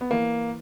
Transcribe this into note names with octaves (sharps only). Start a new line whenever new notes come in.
B3
E3 A#3